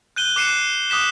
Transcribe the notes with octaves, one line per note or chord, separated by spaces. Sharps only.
F#6 G6 D#7 G7
D6 F#6 C7 C#7 D#7 E7
D6 D#6 F#6 B6 E7